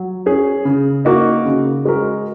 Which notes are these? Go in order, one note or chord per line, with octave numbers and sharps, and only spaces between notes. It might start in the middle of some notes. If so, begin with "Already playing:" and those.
Already playing: F#3
C#4 G#4
C#3
A#3 D#4 F#4
C#3
G#3 F#4 A#4